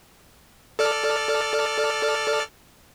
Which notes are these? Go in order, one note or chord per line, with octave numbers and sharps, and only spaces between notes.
A4 D5 F6